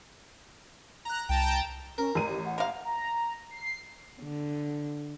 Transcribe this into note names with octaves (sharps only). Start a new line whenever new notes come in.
A#5 F#6
C2 G5 A5 A#5
C#4 A#4
A1 A#5 D#7
G4
F#5
A#4 F5
A#5
C7
D3